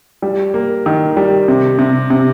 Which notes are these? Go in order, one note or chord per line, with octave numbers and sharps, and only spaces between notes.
G3
A#3
D#3
G3
C3
C3
C3